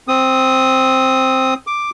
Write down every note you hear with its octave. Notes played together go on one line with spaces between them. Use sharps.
C4 D#6
D6